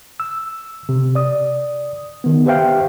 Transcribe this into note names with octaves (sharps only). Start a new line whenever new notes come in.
E6
C3
D5 D#6
D#3 B3
G4 B4 C5 E5 F5 G5